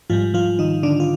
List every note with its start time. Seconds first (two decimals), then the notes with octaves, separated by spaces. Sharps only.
0.10 G#2 F3 G3 F4
0.34 F3 F4
0.59 D#3 D#4
0.83 D3 D4
1.00 F4